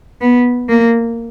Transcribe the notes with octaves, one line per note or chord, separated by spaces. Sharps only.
B3
A#3